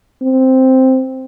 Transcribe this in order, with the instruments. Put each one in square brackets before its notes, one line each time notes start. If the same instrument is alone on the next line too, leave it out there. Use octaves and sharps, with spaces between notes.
[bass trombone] C4